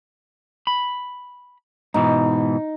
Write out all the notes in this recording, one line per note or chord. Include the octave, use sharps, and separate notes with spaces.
B5
G#2 B2 E3 D#4